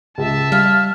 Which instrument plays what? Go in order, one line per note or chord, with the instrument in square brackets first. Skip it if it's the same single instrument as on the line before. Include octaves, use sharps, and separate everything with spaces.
[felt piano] C#2 [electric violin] E5 A5
[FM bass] G3 [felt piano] F5 [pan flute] F6